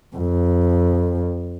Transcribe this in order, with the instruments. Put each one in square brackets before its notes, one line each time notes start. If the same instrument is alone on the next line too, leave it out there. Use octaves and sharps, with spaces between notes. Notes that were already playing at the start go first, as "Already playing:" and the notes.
[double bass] F2